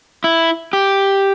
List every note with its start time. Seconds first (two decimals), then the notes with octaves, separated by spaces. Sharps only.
0.24 E4
0.73 G4